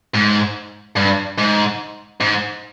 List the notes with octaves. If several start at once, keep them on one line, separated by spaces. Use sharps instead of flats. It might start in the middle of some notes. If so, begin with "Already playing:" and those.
G#2
G2
G#2
G#2